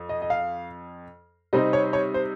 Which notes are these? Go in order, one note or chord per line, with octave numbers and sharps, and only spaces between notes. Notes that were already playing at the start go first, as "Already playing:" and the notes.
Already playing: F2
D#5
D#5
F5
C3 G3 C4 D#4 D#5
C#5
C#5
C5